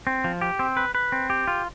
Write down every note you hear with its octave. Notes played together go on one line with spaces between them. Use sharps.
C4
F3
G4
C4
B4
B4
C4
G4
F4